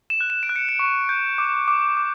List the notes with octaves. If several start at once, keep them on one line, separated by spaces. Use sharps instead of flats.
E7
F#6
E7
D7
F#6
C#7
D7
C#6
G6
D6
D6
D6